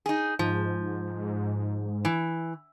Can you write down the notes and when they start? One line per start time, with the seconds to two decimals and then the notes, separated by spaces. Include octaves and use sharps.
0.06 D#4 G#4
0.39 G#2 F3
2.05 E3